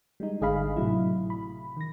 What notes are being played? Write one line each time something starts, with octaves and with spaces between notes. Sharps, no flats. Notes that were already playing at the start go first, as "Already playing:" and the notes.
G3 G#3 D#4
G#1 D3 G#4 D#5 F5 B5
A2 C3 F#3 E4
B5
D#3 A#6